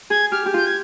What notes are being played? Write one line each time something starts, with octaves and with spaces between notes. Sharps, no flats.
G#4 G#6
G4 F6
G4
F4 G6
G#6